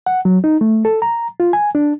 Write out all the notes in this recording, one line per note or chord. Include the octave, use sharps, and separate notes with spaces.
F#5
F#3
D#4
A3
A4
A#5
F4
G#5
D4